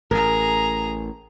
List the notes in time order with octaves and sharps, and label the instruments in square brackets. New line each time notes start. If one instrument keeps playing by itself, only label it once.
[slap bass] A1 [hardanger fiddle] G#4 A#5 [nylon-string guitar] A#4